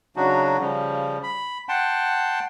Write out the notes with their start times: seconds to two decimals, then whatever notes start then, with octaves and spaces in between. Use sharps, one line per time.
0.16 C#3 F#3 D4 D#4 F#4
0.60 C#3 F3 G3
1.23 B5
1.69 F#5 G5 A5 C6